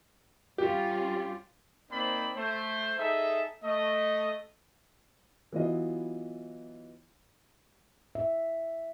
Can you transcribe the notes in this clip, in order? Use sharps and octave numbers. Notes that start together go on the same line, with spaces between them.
G3 C#4 F4 G4
A#3 C4 D#4 C5 D5 B5
A3 C5
D#4 G#4 A4 E5
A3 D#5
E3 F#3 B3 E4 F4 D#5
E5